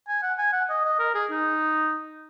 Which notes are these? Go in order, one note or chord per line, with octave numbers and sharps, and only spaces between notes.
G#5
F#5
G#5
F#5
D#5
D#5
A#4
G#4
D#4